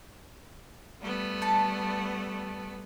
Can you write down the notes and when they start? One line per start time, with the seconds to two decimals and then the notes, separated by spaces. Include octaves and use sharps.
1.00 G3 A3 B3
1.42 C#4 A4 A5